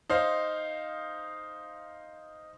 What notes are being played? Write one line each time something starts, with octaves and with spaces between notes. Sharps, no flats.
D#4 C5 F5